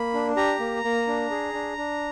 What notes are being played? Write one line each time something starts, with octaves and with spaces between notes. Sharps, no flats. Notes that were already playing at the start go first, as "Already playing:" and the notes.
Already playing: A#3 B5
D4
G4 A#5
A#3
A#3
D4
G#4
D4
D4